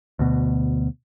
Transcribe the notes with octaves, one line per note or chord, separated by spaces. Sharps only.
D2 B2